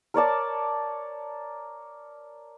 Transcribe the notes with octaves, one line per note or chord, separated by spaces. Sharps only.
A#4 C#5 D5 A5